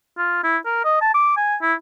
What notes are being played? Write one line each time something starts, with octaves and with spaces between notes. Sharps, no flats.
F4
E4
A#4
D#5
A5
D6
G#5
E4